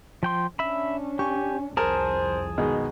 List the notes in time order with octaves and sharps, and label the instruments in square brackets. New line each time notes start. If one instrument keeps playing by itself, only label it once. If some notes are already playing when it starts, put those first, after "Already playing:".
[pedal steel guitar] F3 G5 C6
[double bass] C#4 D4 [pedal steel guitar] E5 B5
[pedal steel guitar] G4 [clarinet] G#5 [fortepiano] C#6
[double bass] C2 F2 [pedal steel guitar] G#4 A5 [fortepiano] A#4 [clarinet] C5
[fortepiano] B2 D#3 G#3